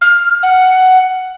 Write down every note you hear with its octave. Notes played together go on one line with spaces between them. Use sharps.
F6
F#5